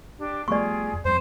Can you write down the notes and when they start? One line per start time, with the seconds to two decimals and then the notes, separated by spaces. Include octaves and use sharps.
0.17 D4 G4
0.48 G3 A3 B3 F4 G4 G#4 D5 C#6
0.93 F2
1.05 F2 G3 C4 C5